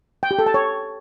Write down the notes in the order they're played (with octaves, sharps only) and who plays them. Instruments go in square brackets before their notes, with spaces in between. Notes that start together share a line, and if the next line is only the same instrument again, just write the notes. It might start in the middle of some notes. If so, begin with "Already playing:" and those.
[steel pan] G5
G4
A4
A5
C#5